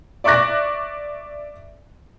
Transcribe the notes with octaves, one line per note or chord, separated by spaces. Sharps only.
D5 E5 C#6 D6 F#6 A#6